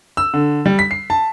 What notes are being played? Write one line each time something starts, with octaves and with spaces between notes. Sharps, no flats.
E6
D3
G3
B6
C7
A5